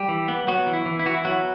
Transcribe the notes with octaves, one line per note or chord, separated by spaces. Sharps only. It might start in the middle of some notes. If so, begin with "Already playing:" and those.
Already playing: G3 G4
E3
B3
F#3 B3 F#4
E3
E4
E3
E4
E3 F#4
E4
F#3 B3 F#4